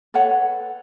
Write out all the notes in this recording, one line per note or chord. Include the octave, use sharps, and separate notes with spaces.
A4 B4 C#5 F#5